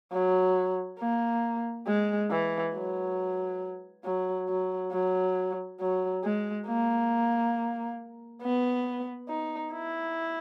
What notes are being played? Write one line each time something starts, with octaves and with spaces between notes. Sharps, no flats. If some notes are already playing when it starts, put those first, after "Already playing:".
F#3
A#3
G#3
E3
F#3
F#3
F#3
F#3
F#3
G#3
A#3
B3
D#4
E4